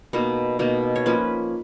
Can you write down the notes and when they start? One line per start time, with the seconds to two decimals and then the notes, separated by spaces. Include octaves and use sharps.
0.13 B2 A#3 D#4 B4
0.59 B2 A#3 D#4
0.96 C#5
1.06 F3 A#3 C#4 B4